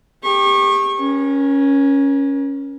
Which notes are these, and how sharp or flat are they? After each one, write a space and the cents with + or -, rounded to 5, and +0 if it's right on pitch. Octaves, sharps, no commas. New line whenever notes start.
G4 +20 C#6 -25
C#4 +0 A#4 +40